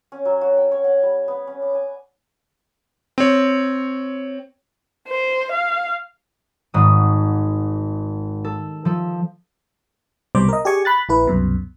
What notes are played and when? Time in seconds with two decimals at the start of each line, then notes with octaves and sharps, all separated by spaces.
0.12 C#4
0.25 F#3
0.41 F#4
0.57 G5
0.71 C#5
0.84 F#5
1.03 G3
1.28 B3
1.47 C#4
1.62 D6
1.75 G#5
3.18 C4 C#5
5.08 C5
5.52 F5
6.74 G#1 G#2 D#6
8.45 A4
8.85 F3 A4
10.35 C2 B2 G3 C5 D6
10.49 A#4 D#5
10.65 G4 G#4 D5 G#5 C#6
10.85 B5 F#6 A6
11.09 A#1 E4 B4
11.27 C2 F#2 B2